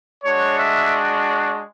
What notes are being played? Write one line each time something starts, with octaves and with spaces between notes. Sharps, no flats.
G#3 D4 F#4 C#5
E5